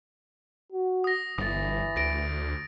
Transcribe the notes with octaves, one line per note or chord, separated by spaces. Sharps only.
F#4
D#6 A#6
G1 E3 D#6 A6
D2 A#6 D7